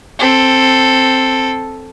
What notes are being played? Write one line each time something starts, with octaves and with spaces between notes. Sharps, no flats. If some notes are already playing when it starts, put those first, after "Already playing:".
C4 A4